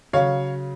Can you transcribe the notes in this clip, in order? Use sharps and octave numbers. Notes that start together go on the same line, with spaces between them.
C#3 F#3 C#5 F5